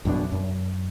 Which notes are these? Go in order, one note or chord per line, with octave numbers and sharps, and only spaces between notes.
A1 F#2 B2 D4
F#2